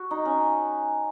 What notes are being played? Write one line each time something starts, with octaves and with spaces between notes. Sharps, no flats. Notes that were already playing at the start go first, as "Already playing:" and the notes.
Already playing: F#4
D#4
C#4